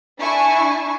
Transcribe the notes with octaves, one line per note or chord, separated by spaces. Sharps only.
D4 E4 G#5 C#6